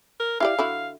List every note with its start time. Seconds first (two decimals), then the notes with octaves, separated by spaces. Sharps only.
0.20 A#4
0.40 E4 G4 D5 F5
0.59 D3 E4 F#4